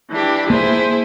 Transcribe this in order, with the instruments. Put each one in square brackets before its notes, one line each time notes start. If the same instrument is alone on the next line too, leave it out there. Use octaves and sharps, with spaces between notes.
[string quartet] E3 D4 G4
[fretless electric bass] A#3 [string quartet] E4 G#4 C5